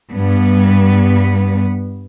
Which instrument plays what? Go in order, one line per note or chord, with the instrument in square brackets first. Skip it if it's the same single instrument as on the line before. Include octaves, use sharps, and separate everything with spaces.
[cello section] G2 B3